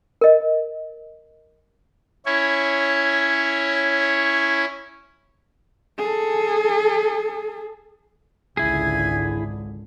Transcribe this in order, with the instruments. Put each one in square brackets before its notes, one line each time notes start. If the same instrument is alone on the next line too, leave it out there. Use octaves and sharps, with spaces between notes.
[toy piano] A#4 D#5
[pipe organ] C#4 E4 C#5
[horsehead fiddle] G#4 A4
[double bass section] G#1 C#2 D3 [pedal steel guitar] E4 G#4 [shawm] G#5